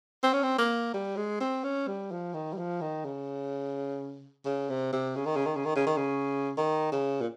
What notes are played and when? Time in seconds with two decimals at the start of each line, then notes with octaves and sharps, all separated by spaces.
0.23 C4
0.33 C#4
0.43 C4
0.58 A#3
0.94 G3
1.17 G#3
1.41 C4
1.64 C#4
1.88 G3
2.11 F3
2.34 D#3
2.53 G3
2.58 F3
2.81 D#3
3.05 C#3
4.45 C#3
4.70 C3
4.93 C3
5.16 C#3
5.26 D#3
5.36 C#3
5.46 D#3
5.56 C#3
5.66 D#3
5.76 C#3
5.87 D#3
5.97 C#3
6.57 D#3
6.92 C#3
7.21 A#2